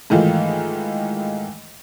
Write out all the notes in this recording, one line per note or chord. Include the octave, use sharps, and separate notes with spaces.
G#2 D#3 E3 A3 F4